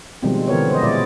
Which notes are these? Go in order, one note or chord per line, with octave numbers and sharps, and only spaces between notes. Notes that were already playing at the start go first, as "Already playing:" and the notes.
B2 D#3 F3 G3 G#3 C4
D3 E3 B3 A#4 C#5
C5 D#5
A#2 G#3 E4 D5